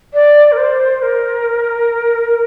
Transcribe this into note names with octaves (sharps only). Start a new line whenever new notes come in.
D5
A#4
C5
A#4